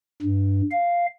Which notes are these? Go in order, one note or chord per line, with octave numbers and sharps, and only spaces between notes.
G2
F5